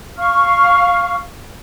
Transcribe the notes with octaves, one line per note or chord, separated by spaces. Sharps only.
F5 C#6 F6